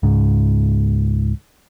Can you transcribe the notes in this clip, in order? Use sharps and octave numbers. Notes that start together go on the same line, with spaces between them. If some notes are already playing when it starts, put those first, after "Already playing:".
C#2 G#2